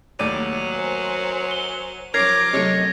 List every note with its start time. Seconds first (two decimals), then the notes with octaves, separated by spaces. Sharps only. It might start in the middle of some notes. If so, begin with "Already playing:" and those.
0.19 D#2 A2 F#3 D5 D#7
0.74 A#4 C5 G#5
1.51 G7
2.14 F3 C#4 A#4 C#5 D6 G#6 A#6 C7
2.53 C3 F#3 A3 C#5 D#5